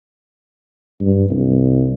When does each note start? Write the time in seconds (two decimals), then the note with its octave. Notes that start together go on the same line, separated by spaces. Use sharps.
1.01 G2
1.30 C2